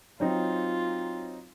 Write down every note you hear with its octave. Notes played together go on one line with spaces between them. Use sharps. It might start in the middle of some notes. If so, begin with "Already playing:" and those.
F#3 C4 D#4 F4